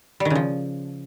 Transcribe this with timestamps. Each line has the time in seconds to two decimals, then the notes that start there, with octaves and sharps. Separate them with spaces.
0.20 G3
0.25 D#3
0.30 C#3
0.35 F3